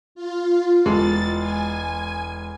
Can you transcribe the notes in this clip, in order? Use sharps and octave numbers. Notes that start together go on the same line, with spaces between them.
F4
E1 G#3 A4 A6
G#5